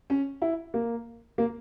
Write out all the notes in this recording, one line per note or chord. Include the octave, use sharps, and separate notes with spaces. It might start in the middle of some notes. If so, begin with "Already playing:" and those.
C#4
E4
A#3
A#3